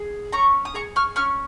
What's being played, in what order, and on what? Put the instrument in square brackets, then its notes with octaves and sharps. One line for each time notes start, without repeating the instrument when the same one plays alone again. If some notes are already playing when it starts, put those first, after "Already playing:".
Already playing: [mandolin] G#4
C#4 A#5 C#6
D#6
G#4 A#5 C#6
C#6 F6
C#4 C#6 F6